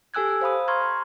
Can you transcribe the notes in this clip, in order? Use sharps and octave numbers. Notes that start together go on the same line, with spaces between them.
G4 A4 G#5 E6 F#6 G#6
C5 F5 B5 D#6
A#5 C6 C#6 F6 G#6